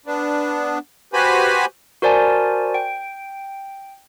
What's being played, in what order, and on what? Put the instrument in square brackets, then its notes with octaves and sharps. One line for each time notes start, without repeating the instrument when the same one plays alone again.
[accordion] B3 D4
F#4 G4 B4 C5 G#5 B5
[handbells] F#4 A#4 C5 D5 G#5 A5
G5